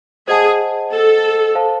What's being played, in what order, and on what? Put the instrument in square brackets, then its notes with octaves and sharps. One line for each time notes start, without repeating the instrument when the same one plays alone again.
[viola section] G#4 [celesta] C5 D#5 F#5 A5
[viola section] A4
[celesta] A4 C5 F5 A5